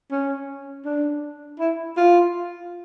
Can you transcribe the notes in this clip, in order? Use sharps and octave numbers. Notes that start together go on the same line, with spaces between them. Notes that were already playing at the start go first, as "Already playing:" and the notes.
C#4
D4
E4
F4